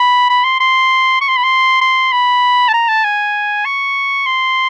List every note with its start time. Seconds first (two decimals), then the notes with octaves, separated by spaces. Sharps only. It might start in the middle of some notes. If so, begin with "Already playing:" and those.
Already playing: B5
0.30 B5
0.44 C6
0.60 C6
1.21 C#6
1.28 C6
1.37 B5
1.44 C6
1.81 C6
2.12 B5
2.68 A5
2.73 A#5
2.89 A5
3.04 G#5
3.65 C#6
4.26 C6